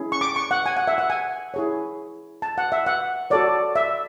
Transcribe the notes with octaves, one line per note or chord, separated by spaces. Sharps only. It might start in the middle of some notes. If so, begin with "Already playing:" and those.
Already playing: C#4 E4 G#4
C#6
D6
C#6
F#5
G#5
F#5
E5
F#5
G#5
E4 G#4 C#5
A5
F#5
E5
F#5
F#4 A4 C#5 D5
E5